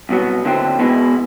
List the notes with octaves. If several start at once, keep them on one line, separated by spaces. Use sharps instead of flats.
C2 B2 F#3 B3
D#2 D3 F#3 A3 C4
E2 B2 G#3 B3 E4